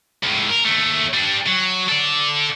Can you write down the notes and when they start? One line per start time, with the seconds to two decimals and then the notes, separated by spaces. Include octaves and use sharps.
0.23 C#2 A2
0.50 A#4
0.65 D#2 A3
1.13 G3 D4
1.47 F#3
1.89 A4 D5